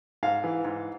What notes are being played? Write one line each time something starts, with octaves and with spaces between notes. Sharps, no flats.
G#2 F5
E3
G#2